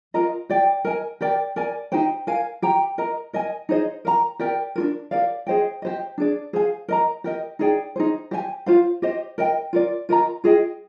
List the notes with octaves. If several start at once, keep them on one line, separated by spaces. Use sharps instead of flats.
F4 A#4 D#5 A#5
G4 D5 G5
A#4 D#5 G#5
G4 A#4 D5 G5
A#4 D5 G#5
D#4 G4 C5 G5
A#4 F5 G#5
G4 C5 G5 A#5
A#4 D#5 A#5
A#4 D#5 G#5
D#4 G#4 C5 D#5
A#4 F5 A#5
G4 A#4 D5 G5
D4 F4 A#4
G4 A#4 D5 F5
G#4 C5 D#5 G5
G4 C5 D#5
D4 G#4 D5
G#4 C5 F5 G#5
A#4 D#5 A#5
G4 A#4 D#5
D#4 G#4 D5 G5
D#4 G#4 C5
G4 C5 F5 G#5
F4 C5 F5
G4 C5 D#5
A#4 D#5 G5
F4 A#4 D5
F4 A#4 D#5 A#5
F4 G#4 D#5 G5